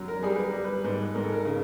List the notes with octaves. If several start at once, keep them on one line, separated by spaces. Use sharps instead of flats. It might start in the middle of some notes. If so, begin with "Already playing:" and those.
Already playing: F#2 F#3
A#4
G3 G#4
B4
A#4
G3
B4
G#2 B4
G#2 A#4
A4
A#4
C#3